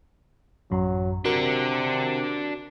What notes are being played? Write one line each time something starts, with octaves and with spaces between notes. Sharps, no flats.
A1 F#2 F#3
C3 D4 F#4 A#4 F#5